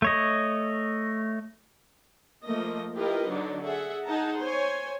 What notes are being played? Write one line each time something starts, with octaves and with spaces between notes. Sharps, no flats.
A3 C#5 D#5
F3 A3 A#3 D#5
E4 F4 G4 A#4 B4 D#5
D3 F#3 D4 D#4
G#4 A4 E5 F#5
D#4 G#4 D#5 F#5 A5 A#5
C5 C#5 G#5